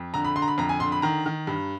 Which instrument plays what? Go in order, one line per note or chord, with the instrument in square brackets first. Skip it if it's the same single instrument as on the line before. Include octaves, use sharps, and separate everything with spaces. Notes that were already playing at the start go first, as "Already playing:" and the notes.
Already playing: [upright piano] F2
D3 A#5
B5
D3 C6
A#5
B5
F2 A#5
G#5
D3 C6
B5
D#3 A#5
D#3
G2